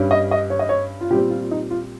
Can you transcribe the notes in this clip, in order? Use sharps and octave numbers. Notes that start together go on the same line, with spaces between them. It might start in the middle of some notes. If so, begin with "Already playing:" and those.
Already playing: G2 G3 C#4
D#5
D#5
C#5
D#5
C#5
F4
A#2 G3 C4 G4
F4
D#4
F4